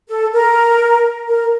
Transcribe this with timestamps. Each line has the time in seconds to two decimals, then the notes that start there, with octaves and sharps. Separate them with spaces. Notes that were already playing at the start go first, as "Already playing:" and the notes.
0.09 A4
0.33 A#4
1.27 A#4